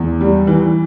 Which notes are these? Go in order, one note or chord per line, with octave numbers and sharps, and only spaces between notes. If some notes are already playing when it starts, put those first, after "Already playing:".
Already playing: E2
G3
E3